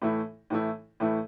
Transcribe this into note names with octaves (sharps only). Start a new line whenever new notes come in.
A2 E3 A3 E4
A2 E3 A3 E4
A2 E3 A3 E4